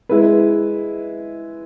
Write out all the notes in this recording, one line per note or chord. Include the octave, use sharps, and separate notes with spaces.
G#3 E4 B4